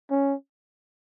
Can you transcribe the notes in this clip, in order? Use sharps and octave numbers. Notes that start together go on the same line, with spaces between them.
C#4